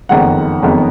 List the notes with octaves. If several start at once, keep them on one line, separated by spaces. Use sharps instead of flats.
F#1 F2 D#3 G#3 B3 F#5
F#1 F2 D#3 G#3 B3